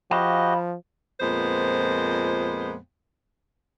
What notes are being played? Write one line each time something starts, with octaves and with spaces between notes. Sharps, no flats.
F3 F#4 G4 D#5 F5 B5
F2 A#2 G#3 B3 C5